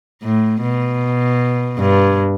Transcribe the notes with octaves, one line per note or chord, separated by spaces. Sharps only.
A2
B2
G2